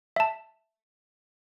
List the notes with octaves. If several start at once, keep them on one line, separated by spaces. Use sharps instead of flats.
E5 A5